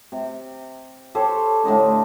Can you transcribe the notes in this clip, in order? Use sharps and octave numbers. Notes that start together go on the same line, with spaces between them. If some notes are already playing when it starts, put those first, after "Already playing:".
C3
G4 A4 C5 C#5
A2 D3 D#4 C5